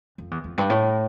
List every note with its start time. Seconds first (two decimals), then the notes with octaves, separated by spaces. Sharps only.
0.18 F2
0.31 E2
0.44 F2
0.58 G2
0.70 A2